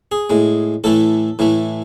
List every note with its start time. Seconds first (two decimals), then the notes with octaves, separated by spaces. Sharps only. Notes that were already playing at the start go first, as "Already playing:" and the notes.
0.12 G#4
0.30 A2 G#3
0.84 A2 E3 A3 A4
1.39 A2 E3 A3